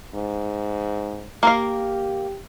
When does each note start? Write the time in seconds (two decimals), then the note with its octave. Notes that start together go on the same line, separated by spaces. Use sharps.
0.14 G#2
1.43 A#3 G4 A#4 F5